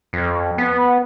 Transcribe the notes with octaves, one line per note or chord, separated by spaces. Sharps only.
F2
B3